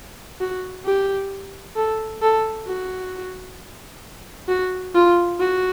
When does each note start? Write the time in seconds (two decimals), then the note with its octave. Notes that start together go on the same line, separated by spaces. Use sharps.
0.41 F#4
0.86 G4
1.76 A4
2.22 A4
2.68 F#4
4.49 F#4
4.95 F4
5.41 F#4